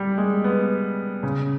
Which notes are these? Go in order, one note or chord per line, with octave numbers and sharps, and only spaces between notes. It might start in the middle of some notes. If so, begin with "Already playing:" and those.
Already playing: G3
G#3
B3
C#3